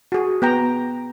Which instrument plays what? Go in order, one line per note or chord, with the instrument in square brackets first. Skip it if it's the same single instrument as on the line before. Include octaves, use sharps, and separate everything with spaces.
[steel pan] F#4 G#4
B3 G5 A#5